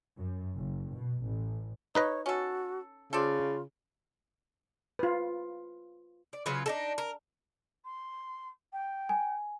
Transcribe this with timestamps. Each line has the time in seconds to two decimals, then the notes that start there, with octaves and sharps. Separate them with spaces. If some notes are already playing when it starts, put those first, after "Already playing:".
0.16 F#2
0.55 F#1
0.92 B2
1.24 A1
1.95 D#4 B4 C#5 D#5
2.26 C#4 F#4 A4
3.13 C#3 F4 A4 C5 D5
4.99 F4 B4
6.33 D5
6.46 C#3 F#3 F4 B4
6.66 D4 D#4 A4
6.98 A#4
7.85 C6
8.73 G5
9.09 G#5